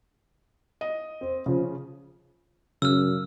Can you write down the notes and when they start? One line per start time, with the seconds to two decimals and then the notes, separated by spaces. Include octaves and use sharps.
0.81 D#5
1.21 C4
1.46 C#3 F3
2.82 F#2 C#3 E6 F6